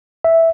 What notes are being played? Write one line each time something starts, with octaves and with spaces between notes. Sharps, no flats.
E5